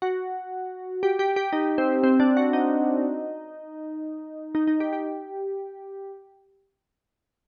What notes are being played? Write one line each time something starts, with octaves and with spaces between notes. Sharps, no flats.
F#4
G4
G4
G4
D#4
C4
C4
D4
F#4
D#4
D#4
D#4
G4
G4